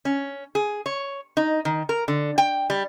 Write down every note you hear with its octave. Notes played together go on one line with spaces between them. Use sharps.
C#4
G#4
C#5
D#4
D#3
A#4
D3
G5
G3